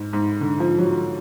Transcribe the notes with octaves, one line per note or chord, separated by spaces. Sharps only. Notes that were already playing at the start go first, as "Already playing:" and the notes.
Already playing: G#2
G#2
D3
F3
F#3